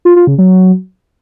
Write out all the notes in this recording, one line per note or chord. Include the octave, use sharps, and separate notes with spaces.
F4
F4
C#3
F#3